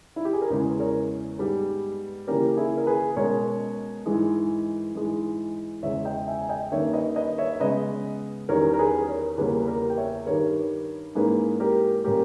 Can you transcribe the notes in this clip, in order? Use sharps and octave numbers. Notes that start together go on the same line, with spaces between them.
E4
G4
G#4
A#4
E2 C#3 E3 G#3 C#4 G#4 B4
A#4 C#5
G#2 G3 B3 G#4 B4
C#3 E3 A#3 C#4 G4 A#4
E4 G#4
A#4
G#4 B4
B2 G#3 C#4 A#4 C#5
G#2 E3 G#3
G#2 E3 G#3
E2 C#3 G#3 C#5 E5
D#5 G5
E5 G#5
G#5
D#5 G5
G2 D#3 A#3 C#4 C#5 E5
B4 D#5
B4 D#5
C#5 E5
E5
C#3 G#3 B3 B4 D#5
E2 D#3 G3 C#4 A#4 C#5
A#4
G#4 B4
A#4 C#5
E2 C#3 G3 A#3 C#4 G#4 B4
B4
G4 A#4
G5
C#5 E5
G2 D#3 G3 A#4 C#5
G#2 E3 A#3 C#4 G#4 B4
G4 A#4
A#2 A#3 C#4 G4 A#4